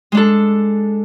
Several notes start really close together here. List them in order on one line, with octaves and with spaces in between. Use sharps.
G#3 D4 A4